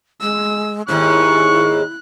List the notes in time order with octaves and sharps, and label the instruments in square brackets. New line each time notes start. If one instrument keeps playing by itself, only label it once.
[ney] G#3 [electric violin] E6
[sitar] D#2 G#2 [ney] E4 [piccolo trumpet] C#6 [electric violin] F#6